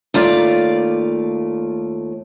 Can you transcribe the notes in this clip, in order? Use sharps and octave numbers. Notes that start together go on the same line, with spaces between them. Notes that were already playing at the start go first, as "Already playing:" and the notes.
D#2 A3 F4 D5